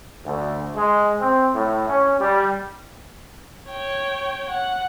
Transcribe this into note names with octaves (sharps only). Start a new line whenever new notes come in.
D2
G#3
C4
A2
C#4
G3
C#5 G5
F#5